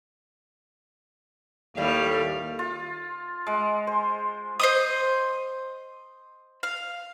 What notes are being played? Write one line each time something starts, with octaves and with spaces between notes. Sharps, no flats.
D#2 A2 G3 F5
F4
G#3
C5
C5 D#5 D#6
F5